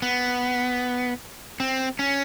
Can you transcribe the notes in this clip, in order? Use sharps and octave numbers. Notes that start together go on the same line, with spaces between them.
B3
C4
C#4